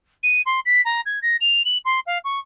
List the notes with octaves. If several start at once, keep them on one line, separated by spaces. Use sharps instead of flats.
D#7
C6
B6
A#5
G#6
A#6
F7
F#7
C6
F5
C#6